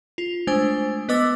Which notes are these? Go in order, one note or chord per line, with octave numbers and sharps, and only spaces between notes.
F4
G#3 A3 D4 C5 G#5
B3 B4 D#5 D6 E6 A6